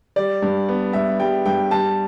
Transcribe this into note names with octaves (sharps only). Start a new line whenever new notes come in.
G3 D5
G2
B3
G2 E5
G3 G5
G2 G5
G3 A5